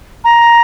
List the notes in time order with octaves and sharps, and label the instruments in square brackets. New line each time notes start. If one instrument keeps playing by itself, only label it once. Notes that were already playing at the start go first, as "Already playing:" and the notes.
[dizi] A#5